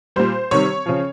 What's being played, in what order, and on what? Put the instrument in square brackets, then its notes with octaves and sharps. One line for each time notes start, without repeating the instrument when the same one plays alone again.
[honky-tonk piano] A#2 G3 C5
C3 D#3 G3 C#5
C#3 F3